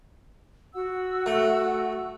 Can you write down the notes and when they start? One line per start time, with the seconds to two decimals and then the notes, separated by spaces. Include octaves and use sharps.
0.74 F#4 F#5 E6
1.26 A3